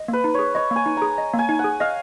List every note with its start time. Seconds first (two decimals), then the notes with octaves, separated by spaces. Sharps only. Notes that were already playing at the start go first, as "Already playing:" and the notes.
Already playing: D#5
0.08 A#3 B4
0.24 D#4
0.34 G#4 C#5
0.55 C#5 D#5
0.71 A#3 G#5
0.86 D#4
0.97 G#4 A#5
1.18 D#5
1.34 A#3
1.39 G#5
1.49 D#4
1.59 F#5
1.64 G#4
1.80 D#5 F5